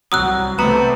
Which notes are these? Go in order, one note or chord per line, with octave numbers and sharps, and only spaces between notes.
C2 F#3 D#6 E6 F#6
C3 A3 B3 A#5